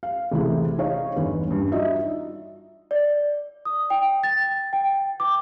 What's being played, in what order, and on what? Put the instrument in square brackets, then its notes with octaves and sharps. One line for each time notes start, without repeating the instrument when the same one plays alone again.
[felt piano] F5
A1 C3 A3 E4 G#4
D#4 C#5 F5
G1 E2 B4
G2 C#4
D4 D#4 F4 F#4 D#5 E5
[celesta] D5
D#6
G5
A6
G5
D6